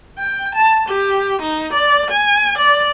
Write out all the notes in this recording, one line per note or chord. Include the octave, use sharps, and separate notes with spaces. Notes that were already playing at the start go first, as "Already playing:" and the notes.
G5
A5
G4
D#4
D5
G#5
D5